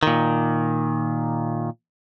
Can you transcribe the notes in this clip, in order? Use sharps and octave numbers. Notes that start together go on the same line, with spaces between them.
A#2 D#3